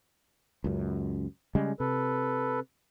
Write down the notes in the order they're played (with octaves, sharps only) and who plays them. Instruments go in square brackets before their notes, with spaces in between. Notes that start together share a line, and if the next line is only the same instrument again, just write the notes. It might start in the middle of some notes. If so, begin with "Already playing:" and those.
[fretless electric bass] C#2 F#2
C#3 G3 G#3
[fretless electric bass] C3 [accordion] A4 B4